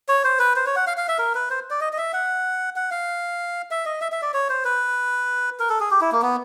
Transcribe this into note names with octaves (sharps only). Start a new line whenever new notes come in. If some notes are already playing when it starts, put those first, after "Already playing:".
C#5
C5
B4
C5
C#5
F#5
F5
F5
E5
A#4
B4
C5
D5
D#5
D#5
E5
F#5
F#5
F5
E5
D#5
E5
E5
D5
C#5
C5
B4
A#4
A4
G#4
G4
E4
A#3
B3